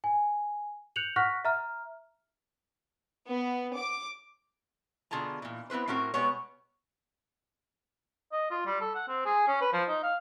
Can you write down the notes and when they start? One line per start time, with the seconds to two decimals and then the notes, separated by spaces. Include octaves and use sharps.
0.04 G#5
0.96 F#6 G6 C#7 F7 F#7
1.16 F#5 C#6 F6 F#6 A#6 B6
1.45 E5 A#5 F6
3.28 B3
3.76 D6
5.11 B2 D3 F4 G#4 A5 A#5
5.42 A#2 E3
5.70 B3 C4 E4 B4 C5
5.87 A2 C4 C#4 F#4 A#4
6.14 B2 G3 G#3 B3 C#5
8.33 D#5
8.51 F4
8.66 G3
8.81 A4
8.95 F#5
9.08 C4
9.26 G#4
9.48 C#4
9.61 B4
9.73 F3
9.88 D#4
10.03 F5